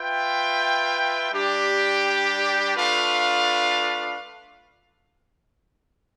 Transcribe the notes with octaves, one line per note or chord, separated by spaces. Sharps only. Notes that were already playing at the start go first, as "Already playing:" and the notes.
Already playing: F4 B4 E5 G5
G3 D4 G4
A3 D4 F4 B4 F5